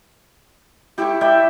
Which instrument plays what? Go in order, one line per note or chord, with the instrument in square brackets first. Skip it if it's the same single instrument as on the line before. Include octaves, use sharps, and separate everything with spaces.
[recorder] E4 [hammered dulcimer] G4 C#6
[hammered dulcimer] D5 E5 G5